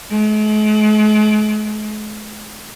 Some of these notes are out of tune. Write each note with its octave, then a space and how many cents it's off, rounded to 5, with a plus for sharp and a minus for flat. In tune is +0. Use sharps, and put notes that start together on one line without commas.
G#3 +45